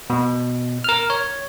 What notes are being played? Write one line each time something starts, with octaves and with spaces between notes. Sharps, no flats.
B2
A#4 F6
C#5